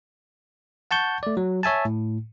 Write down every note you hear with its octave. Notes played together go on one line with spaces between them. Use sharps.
F#5 A5 C#6 G6
A3 D5
F#3
C#5 E5 G#5 A5
A2